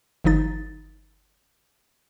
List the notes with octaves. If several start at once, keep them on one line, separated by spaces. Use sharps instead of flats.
G1 D#3 F3 D#4 A6